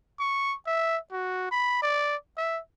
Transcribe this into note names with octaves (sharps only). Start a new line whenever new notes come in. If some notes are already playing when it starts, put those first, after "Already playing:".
C#6
E5
F#4
B5
D5
E5